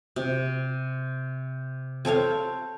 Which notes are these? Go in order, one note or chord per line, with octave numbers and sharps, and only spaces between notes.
C3
C4 A4 C#5 F5